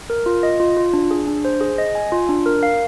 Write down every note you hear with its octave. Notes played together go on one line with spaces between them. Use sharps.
A#4
F4
D#5
F4
F4
D4
G#4
D4
C5
G#4
D#5
G#5
F4
D4
A#4
F5